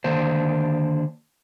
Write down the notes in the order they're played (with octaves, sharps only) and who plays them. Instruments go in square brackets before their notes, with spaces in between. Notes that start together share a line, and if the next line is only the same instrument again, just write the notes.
[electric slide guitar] D3 D#3 A#3 D4 C5